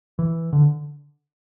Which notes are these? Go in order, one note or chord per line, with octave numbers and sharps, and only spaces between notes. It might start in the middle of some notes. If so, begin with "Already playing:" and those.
E3
D3